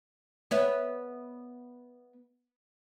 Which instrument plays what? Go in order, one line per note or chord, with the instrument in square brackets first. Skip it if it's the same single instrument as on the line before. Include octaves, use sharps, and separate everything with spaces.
[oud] B3 C#5 E5